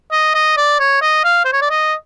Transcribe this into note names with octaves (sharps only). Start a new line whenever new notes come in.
D#5
D#5
D5
C#5
D#5
F5
C5
C#5
D5
D#5